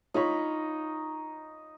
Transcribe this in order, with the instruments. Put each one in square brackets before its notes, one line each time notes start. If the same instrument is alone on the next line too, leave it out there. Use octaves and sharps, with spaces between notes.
[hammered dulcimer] D#4 D#5 B5 [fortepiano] F4 C#5